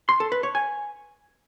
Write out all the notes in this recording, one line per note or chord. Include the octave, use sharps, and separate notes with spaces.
C6
A4
B4
C#5
G#5